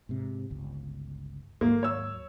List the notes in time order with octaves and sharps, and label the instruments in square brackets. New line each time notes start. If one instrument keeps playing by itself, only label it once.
[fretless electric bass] G#2 C3
G1 C#2
[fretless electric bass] D#2 G#2 F#3 [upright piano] A#3
[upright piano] C#5 E6